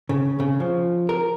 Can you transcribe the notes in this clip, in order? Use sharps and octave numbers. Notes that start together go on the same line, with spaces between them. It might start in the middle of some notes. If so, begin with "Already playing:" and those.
C#3
C#3
F3
A#4